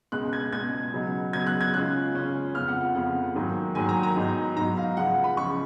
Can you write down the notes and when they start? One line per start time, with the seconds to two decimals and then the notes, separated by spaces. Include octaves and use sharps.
0.12 C#2 B2 G#3 F#6
0.33 G#6
0.52 C#2 B2 G#3 G#6
0.93 C#3 F#3 B3 D#4
1.33 C#3 F#3 B3 D#4 G#6
1.47 F#6
1.61 G#6
1.74 C#3 G#3 C#4 F4 F#6
2.15 C#3 G#3 C#4 F4
2.54 F2 C#3 F3 B3 F4 F6
2.68 F#5
2.81 F#5
2.95 F2 C#3 F3 B3 F4 F#5
3.35 G#2 D#3 F#3 A#3
3.75 G#2 D#3 F#3 A#3 G#5
3.89 A#5
4.03 A#5
4.16 G#2 F#3 B3 D#4
4.56 G#2 F#3 B3 D#4 A#5
4.77 F5
4.97 C#2 C#3 F3 F#5
5.24 B5
5.37 C#2 C#3 F3 C#6